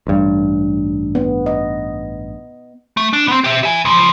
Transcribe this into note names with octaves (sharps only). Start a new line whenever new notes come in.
A1 G2
B3
D#5
A3
D4
B3 C4
G4 E5
E5 G#5
C#2 F3